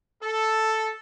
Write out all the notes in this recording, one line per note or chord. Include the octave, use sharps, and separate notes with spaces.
A4